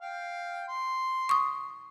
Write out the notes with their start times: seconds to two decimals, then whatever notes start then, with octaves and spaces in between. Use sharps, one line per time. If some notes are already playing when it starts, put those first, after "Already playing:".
0.02 F5 G5
0.68 C6
1.29 C#6 D#6